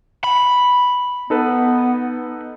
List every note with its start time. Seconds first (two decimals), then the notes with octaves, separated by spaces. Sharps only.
0.24 B5
1.30 B3 D#4 A4 B4